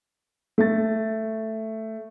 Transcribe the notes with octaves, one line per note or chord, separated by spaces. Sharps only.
A3 A6